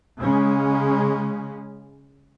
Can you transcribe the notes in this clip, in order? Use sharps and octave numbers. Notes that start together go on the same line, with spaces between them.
C#3 G#3 C#4